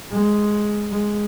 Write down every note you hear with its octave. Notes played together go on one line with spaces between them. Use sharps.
G#3
G#3